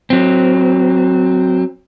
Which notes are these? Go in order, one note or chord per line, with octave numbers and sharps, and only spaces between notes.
F#3 C4